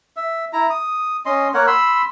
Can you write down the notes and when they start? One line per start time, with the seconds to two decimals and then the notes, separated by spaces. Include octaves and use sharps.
0.17 E5
0.53 E4 A#5
0.70 D#6
1.26 C#4 D#5 C6
1.54 A#3 A#4 C#5 F#5
1.67 B5 C6 E6